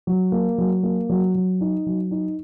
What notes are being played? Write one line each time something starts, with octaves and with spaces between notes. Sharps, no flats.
F#3
A#3
F#3
A#3
F#3
F#3
D#4
F#3
D#4